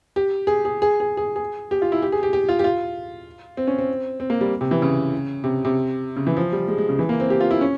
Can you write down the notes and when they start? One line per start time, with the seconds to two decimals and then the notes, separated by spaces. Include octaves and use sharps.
0.16 G4
0.47 G#4
0.65 G#4
0.82 G#4
1.00 G#4
1.17 G#4
1.36 G#4
1.71 G4
1.82 F4
1.92 E4
2.02 G4
2.12 G#4
2.23 G4
2.33 G4
2.49 F4
2.59 G4
2.64 F4
3.57 C4
3.67 C#4
3.79 C4
4.20 C4
4.30 A#3
4.41 G3
4.61 C3
4.71 E3
4.82 C#3
5.44 C3
5.65 C3
6.16 C#3
6.27 E3
6.37 F3
6.52 G3
6.68 G#3
6.78 G#3
6.89 C#3
6.99 E3
7.09 A#3
7.20 C4
7.30 G4
7.40 F4
7.51 E4
7.61 C#4